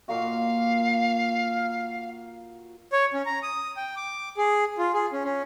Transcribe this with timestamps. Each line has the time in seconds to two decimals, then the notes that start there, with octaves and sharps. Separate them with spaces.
0.08 A#2 A#3 F#4 F5
2.93 C#5
3.14 C#4
3.26 A#5
3.43 D#6
3.77 G5
3.96 D6
4.37 G#4
4.78 F4
4.94 G#4
5.13 C#4
5.25 C#4